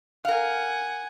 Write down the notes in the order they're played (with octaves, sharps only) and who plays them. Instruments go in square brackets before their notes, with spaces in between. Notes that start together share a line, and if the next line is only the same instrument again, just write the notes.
[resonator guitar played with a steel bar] A#4 F5 [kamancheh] F#5 G#5